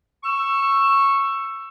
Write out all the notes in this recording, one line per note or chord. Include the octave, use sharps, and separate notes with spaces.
C#6 E6